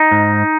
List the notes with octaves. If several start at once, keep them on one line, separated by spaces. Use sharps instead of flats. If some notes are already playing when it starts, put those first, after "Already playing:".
Already playing: D#4
G#2